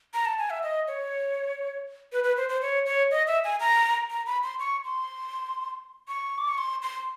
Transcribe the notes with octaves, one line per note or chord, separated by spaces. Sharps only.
A#5
A5
G#5
E5
D#5
C#5
B4
B4
C5
C5
C#5
C#5
D#5
E5
G#5
A#5
A#5
B5
C6
C#6
C6
C#6
D6
C#6
C6
C6